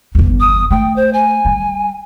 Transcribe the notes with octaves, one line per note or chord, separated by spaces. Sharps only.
G1 E2
D#6
A3 G5
C5
G#5
G3